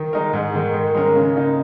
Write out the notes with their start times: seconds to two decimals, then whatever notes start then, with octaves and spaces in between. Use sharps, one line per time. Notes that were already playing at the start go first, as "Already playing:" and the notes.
Already playing: D#3
0.13 G#3 D#4 A#4
0.33 G#2
0.55 D#3 G#3
0.74 D#3
0.95 G#3 C#4 A#4
1.15 C#3
1.36 A#3 D#4